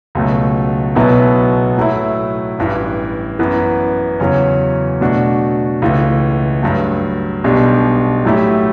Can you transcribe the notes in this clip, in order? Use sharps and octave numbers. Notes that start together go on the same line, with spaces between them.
C#2 B2 F#3 A3
B1 B2 F#3 B3 E4
A2 F#3 A3 E4
A1 G2 E3
F#2 E3 B3
E2 C#3 F#3 C#4
B2 A3 D4 F#4
C#2 C#3 E3 A3
G2 F#3 A3
B1 B2 G3 D4 G4
A2 F#3 A3 E4 G4